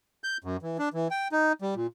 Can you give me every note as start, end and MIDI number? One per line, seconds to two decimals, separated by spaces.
0.24 0.37 91
0.44 0.57 42
0.62 0.77 52
0.79 0.89 62
0.94 1.08 52
1.11 1.28 79
1.32 1.53 63
1.62 1.75 55
1.75 1.87 46